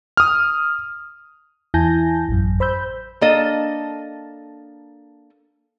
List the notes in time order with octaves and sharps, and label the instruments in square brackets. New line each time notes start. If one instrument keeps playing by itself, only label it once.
[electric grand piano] D#6 F6
[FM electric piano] E2 E4 G#5 A5 G6 A#6
A1 F#2
C5 B5 E6 G6
[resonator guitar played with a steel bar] A#3 D4 A4 D#5